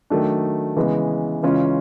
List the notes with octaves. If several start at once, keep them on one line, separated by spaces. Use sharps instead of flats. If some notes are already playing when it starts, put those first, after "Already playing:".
D#3 F#3 A3 D4
C#3 E3 G#3 B3
C#3 E3 G#3 C#4 F4